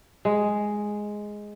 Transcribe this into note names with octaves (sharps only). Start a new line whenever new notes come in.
G#3